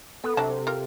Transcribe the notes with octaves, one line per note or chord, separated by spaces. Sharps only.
B3 A4
C3 F#3 D4 A5
F4 G4 A#4